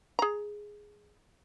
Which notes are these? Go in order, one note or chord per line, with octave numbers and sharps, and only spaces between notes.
G#4 A#5